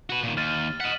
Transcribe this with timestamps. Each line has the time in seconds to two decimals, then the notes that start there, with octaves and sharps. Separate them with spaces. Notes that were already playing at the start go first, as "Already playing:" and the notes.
0.10 F#4 B4
0.23 A#2 D#3
0.37 D#2 F6 A6 D#7
0.80 D#5 F#5 B6 F#7